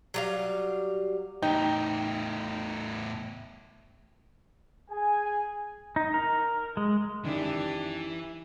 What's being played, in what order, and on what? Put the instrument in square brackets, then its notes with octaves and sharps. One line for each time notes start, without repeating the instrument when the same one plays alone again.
[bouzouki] F#3 G3 F5
[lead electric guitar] E2 A2 [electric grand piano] D#4 [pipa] G5
[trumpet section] G#4 G#5
[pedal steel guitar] D#4
A#4
G#3
[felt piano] F#2 D#3 [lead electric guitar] E3 E4 [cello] D4 G4